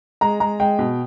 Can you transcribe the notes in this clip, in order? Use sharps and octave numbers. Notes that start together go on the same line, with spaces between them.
G#3 A#5
G#3 A#5
G#3 G5
B2